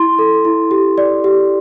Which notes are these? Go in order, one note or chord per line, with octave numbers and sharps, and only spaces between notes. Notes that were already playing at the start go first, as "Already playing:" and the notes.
Already playing: E4 C6
A4
E4
G4
D5
G4